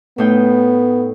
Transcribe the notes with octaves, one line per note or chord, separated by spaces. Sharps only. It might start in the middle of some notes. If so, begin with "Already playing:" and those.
A2 B3 D#4 G5